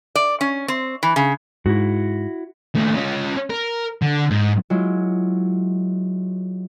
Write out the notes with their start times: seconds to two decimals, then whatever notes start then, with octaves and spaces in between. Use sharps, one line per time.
0.15 D5
0.41 C#4
0.68 C4
1.03 E3
1.16 C#3
1.66 G#2 E4 F#4
2.75 D#2 A3
2.95 C#4 F4
3.50 A#4
4.02 D3
4.30 G#2
4.70 F#3 G#3 E4 F4